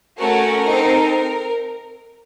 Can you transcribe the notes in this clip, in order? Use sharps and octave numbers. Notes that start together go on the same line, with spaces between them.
A3 C#4 F#4 A4 A#4
C4 D#4 A4